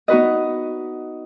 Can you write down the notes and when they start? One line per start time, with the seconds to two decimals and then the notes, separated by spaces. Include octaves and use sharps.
0.08 B3 D#4 F#4 B4 D#5